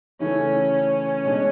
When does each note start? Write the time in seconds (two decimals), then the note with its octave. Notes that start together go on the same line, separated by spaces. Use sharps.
0.20 C#3 E3 A3 C#4
0.72 C#4
1.25 B2 G#3 D4